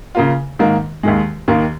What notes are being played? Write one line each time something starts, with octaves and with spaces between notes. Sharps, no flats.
C#3 A#3 F4
G#2 D#3 A#3
D#2 D#3 G#3
D#2 D#3 A#3